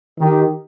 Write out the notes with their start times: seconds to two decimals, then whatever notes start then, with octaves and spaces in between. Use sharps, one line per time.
0.20 D#3 G4